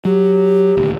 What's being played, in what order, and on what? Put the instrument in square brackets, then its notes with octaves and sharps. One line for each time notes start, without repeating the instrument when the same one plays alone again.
[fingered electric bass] F#3 [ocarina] G4
[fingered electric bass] D#1 D2